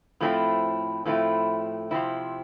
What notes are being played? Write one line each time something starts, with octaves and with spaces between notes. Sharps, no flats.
A2 F3 A3 C4 E4
A2 F3 A3 C4 E4
C3 F3 C4 E4